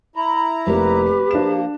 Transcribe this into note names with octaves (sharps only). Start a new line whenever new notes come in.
E4 A#5 B5
F1 A#3 G4 B4
F3 A#3 D4 E7